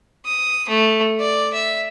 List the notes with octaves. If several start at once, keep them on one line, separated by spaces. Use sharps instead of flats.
D#6
A3
D5
E5